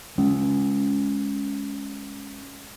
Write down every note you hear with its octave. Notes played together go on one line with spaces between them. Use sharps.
G#3 C#4